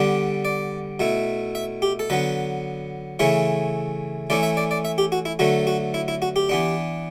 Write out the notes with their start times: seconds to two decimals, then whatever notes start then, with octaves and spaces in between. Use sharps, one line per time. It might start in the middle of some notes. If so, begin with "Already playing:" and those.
Already playing: D3 G3 B3 D4
0.45 D5
0.99 B2 A3 E4
1.55 E5
1.82 G4
1.99 A4
2.10 D3 F#3 B3 B4
3.19 C#3 E3 A3 C#4 E4 C#5
4.30 E3 A3 C#4 E4 D5
4.43 E5
4.57 D5
4.71 D5
4.85 E5
4.98 G4
5.12 F#4
5.25 E4
5.39 D3 F#3 A3 F#4
5.67 F#4
5.94 E4
6.08 E4
6.22 F#4
6.36 G4
6.49 E3 B3 D4